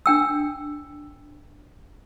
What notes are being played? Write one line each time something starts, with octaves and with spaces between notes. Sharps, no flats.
D4 G5 E6